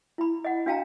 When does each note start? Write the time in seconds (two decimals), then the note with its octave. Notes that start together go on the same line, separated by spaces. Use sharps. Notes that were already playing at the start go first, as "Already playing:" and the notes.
0.18 E4 B5
0.45 D#5 F#5
0.66 D4 F#4 F5 G5 A5 A#5